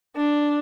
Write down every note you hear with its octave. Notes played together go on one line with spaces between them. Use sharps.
D4